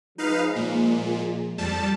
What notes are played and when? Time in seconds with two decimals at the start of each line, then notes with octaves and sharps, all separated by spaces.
0.18 F3 G#3 D#4 B4 F5
0.56 A#2
1.58 F2 G3 A5